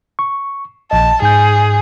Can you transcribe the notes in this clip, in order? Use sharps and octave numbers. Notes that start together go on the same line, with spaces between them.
C#6
A#1 D#5 A5
G#2 G#4 G#5 G6